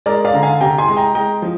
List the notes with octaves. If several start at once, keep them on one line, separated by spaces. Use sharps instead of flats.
G#3 A#4 D5
D5 F5
D3 A#5
F5 G#5
C3 G5 A#5
G#5 C6
G#3
G5 A#5
G#3 G5 A#5
F3